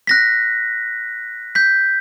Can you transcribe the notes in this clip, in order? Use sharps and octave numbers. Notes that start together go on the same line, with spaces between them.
F#6 A#6 B6
G6 B6